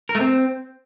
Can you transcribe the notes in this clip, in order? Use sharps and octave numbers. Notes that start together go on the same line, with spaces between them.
A#4
A3
C4